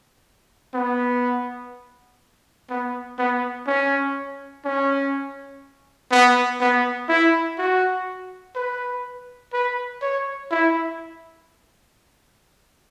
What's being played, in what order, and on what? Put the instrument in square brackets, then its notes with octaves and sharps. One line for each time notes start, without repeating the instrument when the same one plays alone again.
[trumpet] B3
B3
B3
C#4
C#4
B3
B3
E4
F#4
B4
B4
C#5
E4